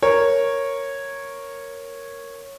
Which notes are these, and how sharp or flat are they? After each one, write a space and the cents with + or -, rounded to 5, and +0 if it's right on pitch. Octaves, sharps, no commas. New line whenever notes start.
A#4 +0 C#5 -10